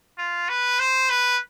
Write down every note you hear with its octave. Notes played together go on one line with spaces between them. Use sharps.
F4
B4
C5
B4